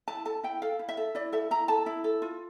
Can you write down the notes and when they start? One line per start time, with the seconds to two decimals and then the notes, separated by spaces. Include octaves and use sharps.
0.08 E4 A5
0.25 A4 A5
0.43 E4 G5
0.62 A4 F5
0.79 E4
0.89 E5
0.97 A4
1.15 E4 D5
1.32 A4 E5
1.51 E4 A#5
1.68 A4 A5
1.86 E4
2.04 A4
2.22 F4